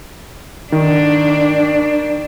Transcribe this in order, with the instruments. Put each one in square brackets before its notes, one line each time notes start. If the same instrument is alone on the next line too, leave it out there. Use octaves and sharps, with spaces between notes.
[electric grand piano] D#3 [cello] D4